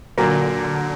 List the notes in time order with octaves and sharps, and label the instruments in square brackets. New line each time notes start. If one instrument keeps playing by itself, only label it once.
[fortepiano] A#2 F#3 A#3 [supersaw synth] D3